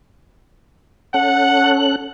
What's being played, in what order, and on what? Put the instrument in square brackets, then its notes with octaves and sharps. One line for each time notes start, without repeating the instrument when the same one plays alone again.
[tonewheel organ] C#4 A4 F#6 [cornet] F#5